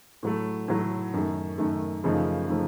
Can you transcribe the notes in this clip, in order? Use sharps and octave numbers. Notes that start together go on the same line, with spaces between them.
A2 F#3 A3
A2 F#3 A3
F#2 D#3 A3
F#2 D#3 A3
F#2 C#3 F3 A3 D#4
C#3 F3 A3 D#4